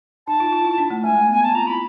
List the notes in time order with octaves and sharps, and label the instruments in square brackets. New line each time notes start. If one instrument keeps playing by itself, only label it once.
[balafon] D#4 [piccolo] A5
[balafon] F4
F4
E4
D4
A3
[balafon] G#3 [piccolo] G#5
[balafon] A3
B3
[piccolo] G#5
[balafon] C4 [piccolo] A5
[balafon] F4 [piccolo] A#5
[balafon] E4 [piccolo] B5